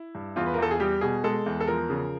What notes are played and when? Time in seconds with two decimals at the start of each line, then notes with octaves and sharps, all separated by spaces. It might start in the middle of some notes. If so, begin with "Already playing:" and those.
Already playing: E4
0.15 G2
0.36 E2 F4
0.46 B4
0.54 A#4
0.58 E2 A4
0.71 G#4
0.80 G3 G4
1.01 B2 G#4
1.24 G#3 A4
1.46 E2
1.60 A4
1.67 F3 A#4
1.90 C#3